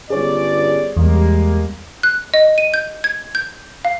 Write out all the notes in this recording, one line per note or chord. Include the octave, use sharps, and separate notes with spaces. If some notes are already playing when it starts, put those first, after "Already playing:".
G1 C#4 G#4 C#5 D5
E2 G3 G#3 A#3
F#6
D#5
D#7
G6
G#6
G6
F5